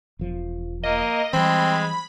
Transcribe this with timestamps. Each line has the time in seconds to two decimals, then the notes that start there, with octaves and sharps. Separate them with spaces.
0.19 E1 F3
0.84 A#3 D#5
1.33 E3 G3 G#3 C4 B5